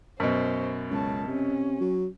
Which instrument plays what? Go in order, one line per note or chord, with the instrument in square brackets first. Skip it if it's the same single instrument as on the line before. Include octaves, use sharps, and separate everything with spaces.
[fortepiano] F#2 B2 [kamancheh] C5
[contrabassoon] C#2 [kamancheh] C#5 A5
[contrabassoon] C3 [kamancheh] C#4
[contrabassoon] F#3